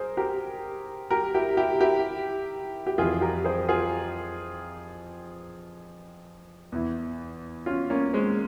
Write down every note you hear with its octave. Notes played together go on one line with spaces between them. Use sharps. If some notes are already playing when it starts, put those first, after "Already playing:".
Already playing: G#4 A#4 C5
G4 A#4
G4 A#4
E4 G4
E4 G4
E4 G4
G4
F2 E3 F4 G#4
G4 A#4
G#4 C5
F4 G#4
E2 E3
C#4 F4
A#3 C#4
G#3 C4